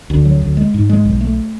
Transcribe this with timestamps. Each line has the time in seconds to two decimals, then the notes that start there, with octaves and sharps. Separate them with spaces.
0.10 D2
0.25 F#3
0.41 D2
0.57 G#3
0.74 G#2
0.89 G#3
1.05 B1
1.21 A3